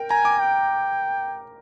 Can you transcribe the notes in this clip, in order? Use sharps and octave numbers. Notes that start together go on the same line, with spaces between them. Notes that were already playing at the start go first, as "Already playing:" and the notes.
Already playing: A#4 G5
G#5 A#5
D6
G5